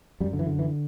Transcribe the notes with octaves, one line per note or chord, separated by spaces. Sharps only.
F#2 G3
D3
E3
D3
E3